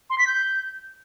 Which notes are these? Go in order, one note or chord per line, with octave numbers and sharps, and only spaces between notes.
C6
B6
G6